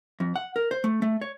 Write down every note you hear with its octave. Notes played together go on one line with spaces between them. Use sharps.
F2
F#5
A#4
C5
A3
A3
C#5